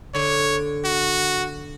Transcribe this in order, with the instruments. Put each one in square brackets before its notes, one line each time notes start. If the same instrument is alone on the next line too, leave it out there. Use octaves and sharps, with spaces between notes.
[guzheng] D3 [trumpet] C#5
[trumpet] F#4